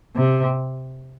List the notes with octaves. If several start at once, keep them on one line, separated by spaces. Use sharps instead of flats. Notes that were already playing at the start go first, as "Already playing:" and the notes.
C3